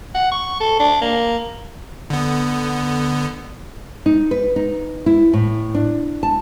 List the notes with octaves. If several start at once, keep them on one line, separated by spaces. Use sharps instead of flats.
F#5
C#6
A4
D4
A#3
D3 B3
D#4
B4
D#4
E4
A2
D4
A5